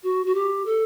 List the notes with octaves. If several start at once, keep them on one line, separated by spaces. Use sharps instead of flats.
F#4
F#4
G4
A4